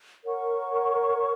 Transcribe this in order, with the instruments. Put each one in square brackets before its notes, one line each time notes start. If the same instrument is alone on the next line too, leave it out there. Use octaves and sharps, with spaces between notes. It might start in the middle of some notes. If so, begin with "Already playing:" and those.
[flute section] A#4 C#5 F#5 C#6